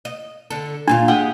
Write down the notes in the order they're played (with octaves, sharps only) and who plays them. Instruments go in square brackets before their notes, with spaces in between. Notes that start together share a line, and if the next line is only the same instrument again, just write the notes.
[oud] D#5
D3 A4
[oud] D#2 A#2 F4 [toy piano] D4
[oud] G#3 [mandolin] G4 F#5 D#6